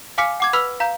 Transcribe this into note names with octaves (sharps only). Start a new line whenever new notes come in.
F5 G#5 D6 F6 B6 C#7
F#5 D6 G#6
B4 B5 E6 F6 B6 F7
F5 A#5 G6